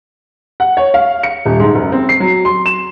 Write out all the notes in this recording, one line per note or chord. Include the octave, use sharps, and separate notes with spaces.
F#5
C#5
F5
C#7
D#1
G#2
F#1
C4
C7
F#3
C6
E7